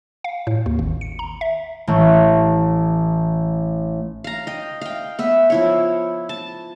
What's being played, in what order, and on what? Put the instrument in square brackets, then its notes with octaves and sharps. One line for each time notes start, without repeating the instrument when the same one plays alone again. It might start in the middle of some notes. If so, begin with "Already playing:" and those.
[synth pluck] F5
A2
D#2
G#1
C#7
A#5
E5
[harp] A1 A3
[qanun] F5 A#5
D#5 G5
F5 G5
B3 E5
F3 E4 C#5
A5